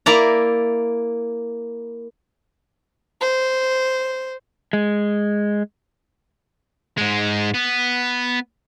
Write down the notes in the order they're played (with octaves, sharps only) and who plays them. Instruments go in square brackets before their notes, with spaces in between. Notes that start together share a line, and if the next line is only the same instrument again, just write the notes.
[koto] A#3 E4 D5 A#5
[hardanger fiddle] C5
[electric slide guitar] G#3
[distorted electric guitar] G#2 G#3
B3